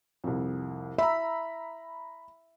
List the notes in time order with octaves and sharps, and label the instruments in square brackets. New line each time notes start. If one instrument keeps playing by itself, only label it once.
[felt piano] C2 F2
[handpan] E5 [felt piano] A#5 B5